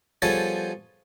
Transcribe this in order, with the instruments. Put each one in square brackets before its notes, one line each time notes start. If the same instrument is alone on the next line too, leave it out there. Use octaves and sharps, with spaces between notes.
[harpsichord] F3 G3 B3 G#4 A4 C#5